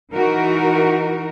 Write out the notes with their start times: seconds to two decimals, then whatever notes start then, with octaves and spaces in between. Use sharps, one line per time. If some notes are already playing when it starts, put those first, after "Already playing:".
0.12 E3 D#4 F#4 A#4